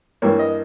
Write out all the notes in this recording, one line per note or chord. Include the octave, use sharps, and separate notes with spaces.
G2 E3 A#3 C#5
D#5